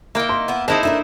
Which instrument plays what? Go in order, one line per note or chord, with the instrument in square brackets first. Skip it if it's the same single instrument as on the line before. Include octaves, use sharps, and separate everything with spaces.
[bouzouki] D#3 E4 [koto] A#3 G5
[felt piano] C6
[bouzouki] B3 E4
[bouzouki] G#3 A#3 C4 [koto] D#4 E4 C5 [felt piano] A5
[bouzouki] A3 G#4 A#4 [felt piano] D4 E5